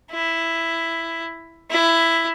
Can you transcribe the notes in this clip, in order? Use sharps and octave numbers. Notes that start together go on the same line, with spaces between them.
E4
E4